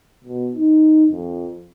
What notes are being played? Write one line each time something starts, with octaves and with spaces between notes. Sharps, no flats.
B2
D#4
F2